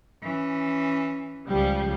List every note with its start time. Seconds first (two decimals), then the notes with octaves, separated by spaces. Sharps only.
0.22 E3 C#4
1.48 C#2 F3 G3